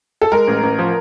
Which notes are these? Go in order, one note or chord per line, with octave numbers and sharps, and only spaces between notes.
A4
G#3 A#4
A1
A1
F3